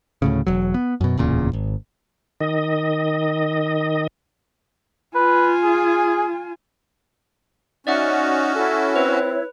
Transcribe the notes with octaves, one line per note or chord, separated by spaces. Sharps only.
D2 A2 C#3
E1 F#3
B3
F#2 B2
D1 E2 A#2 C#3
G#1
D#3 D#5
F4 B4 G#5
G#4
C#4 D#4 F#4 D5 E5 F#5
E4 A4 C#5
C4 B4